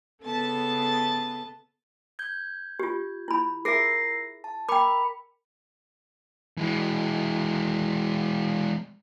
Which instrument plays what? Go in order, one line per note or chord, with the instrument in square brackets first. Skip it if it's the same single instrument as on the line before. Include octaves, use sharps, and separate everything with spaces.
[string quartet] C#3 B3 A4 A5 A6
[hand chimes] G6 G#6
[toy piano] F4 G4
E4 B5
[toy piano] G#4 E5 [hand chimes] A#4 A#6 C7
[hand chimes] A5
[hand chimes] A#4 B5 C#7 [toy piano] G5 D6
[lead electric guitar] E3 G#3